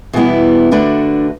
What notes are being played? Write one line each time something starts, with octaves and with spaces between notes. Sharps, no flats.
E2 B2 G3 B3 E4
D3 A3 D4 F#4 B4